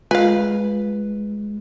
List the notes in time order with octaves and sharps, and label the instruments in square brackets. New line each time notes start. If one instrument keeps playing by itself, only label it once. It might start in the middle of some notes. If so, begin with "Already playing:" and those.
[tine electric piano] G#3 [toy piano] F4 [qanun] B4 [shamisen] F5 G#5